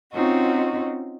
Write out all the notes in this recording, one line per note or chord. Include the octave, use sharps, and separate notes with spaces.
C4 C#4 D#4 F4 F#4 D#5